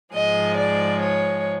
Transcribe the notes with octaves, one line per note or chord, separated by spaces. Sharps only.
G#2 F3 G#3 D#5
D5
C#5